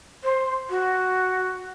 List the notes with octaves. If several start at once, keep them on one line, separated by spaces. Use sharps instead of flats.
C5
F#4